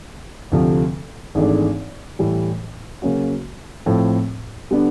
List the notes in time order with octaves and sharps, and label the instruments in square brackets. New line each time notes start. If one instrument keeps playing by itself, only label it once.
[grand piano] D2 C3 F3 A3
G#1 G#2 E3 A3 D4
A2 E3 G3
C#3 F#3 A#3 C#4 F#4
A2 F3 A3 C4
D3 G3 B3 D4